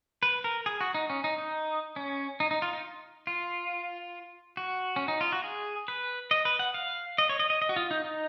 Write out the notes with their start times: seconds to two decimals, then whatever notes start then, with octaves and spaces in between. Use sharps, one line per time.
0.23 B4
0.44 A#4
0.66 G#4
0.81 F#4
0.94 D#4
1.10 C#4
1.24 D#4
1.38 D#4
1.96 C#4
2.40 D#4
2.51 D#4
2.62 F4
2.73 D#4
3.27 F4
4.57 F#4
4.96 C#4
5.08 D#4
5.21 F4
5.32 F#4
5.44 G#4
5.88 B4
6.31 D#5
6.45 B4
6.59 F#5
6.74 F5
7.18 D#5
7.29 C#5
7.39 D#5
7.50 D#5
7.62 D#5
7.69 F#4
7.76 F4
7.91 D#4
8.05 D#4